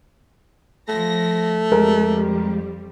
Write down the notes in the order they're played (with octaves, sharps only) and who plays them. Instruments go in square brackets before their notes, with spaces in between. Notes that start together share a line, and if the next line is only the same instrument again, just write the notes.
[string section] F3 A#6 [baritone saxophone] A3
[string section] F2 G3 [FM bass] G#3 [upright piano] A#4